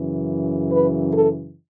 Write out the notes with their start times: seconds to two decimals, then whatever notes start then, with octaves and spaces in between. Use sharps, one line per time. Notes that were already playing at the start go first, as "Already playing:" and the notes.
Already playing: F#2 C#3 E3
0.71 B4
1.13 A4